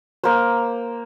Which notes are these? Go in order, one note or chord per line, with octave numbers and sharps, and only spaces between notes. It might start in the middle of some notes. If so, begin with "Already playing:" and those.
A#3 C5